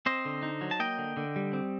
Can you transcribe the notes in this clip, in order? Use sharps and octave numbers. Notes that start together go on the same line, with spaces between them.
C4 C5 D#5
D3
D#4
F#3
A5
A#3 D#5 G5
D3
D3
G3
C4